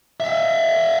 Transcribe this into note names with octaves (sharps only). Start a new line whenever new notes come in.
E5 F5